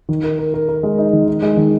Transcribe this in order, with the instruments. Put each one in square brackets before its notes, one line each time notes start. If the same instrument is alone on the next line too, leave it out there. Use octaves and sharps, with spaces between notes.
[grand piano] D#3
A#4
A#4
A#4
A#4
G#3
D#4
D#3
D#4
G#3
D#3